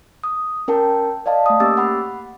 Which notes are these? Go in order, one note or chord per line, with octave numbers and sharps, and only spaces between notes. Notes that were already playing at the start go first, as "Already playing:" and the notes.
D#6
C#4 A#4 G5 A5
D5 D#5 F5 A5
A3 D#6
A#3 C#4 G4 D6 E6 A6
F#5 B5